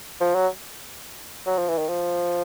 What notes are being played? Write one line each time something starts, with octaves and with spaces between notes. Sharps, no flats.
F3
F#3
F#3
F3
E3
D#3
F3